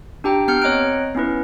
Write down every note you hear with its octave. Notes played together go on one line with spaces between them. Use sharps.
D4 G4 G5 A#5
B3 F6 G6 C#7
C4 C#5 D#5 A#5 F#6 D7
B3 C#4 E4 B4